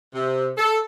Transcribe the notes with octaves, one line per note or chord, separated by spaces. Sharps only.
C3
A4